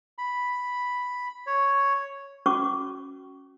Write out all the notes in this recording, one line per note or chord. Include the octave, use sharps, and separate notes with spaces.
B5
C#5
C#4 F#4 C#6 D6